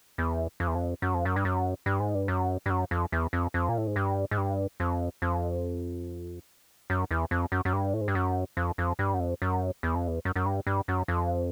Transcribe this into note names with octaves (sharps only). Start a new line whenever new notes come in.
E2
F2
E2
F2
F#2
F2
F#2
G2
F#2
G2
G#2
G2
F#2
G2
F#2
F2
E2
F2
F2
A#2
A2
G#2
G2
G#2
G2
F2
F2
F#2
E2
F2
F#2
F#2
G2
A2
G#2
G2
F#2
F2
F2
G2
F#2
F2
F#2
E2
F2
E2
F#2
F#2
G2
G2
F#2
F2